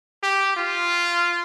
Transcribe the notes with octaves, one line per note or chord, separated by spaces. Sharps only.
G4
F4